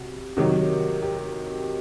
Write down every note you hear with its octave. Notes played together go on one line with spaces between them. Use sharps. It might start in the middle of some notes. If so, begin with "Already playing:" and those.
Already playing: C3 F#4
C3 D#3 F#3
G4